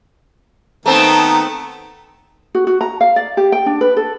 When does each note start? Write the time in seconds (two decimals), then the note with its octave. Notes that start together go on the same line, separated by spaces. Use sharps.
0.86 D#3 A3 B3 C4 A5 A#5
2.55 F#4
2.67 F#4
2.81 A#5
3.01 F5
3.16 D5
3.37 G4
3.52 G5
3.66 D4
3.81 B4
3.97 A4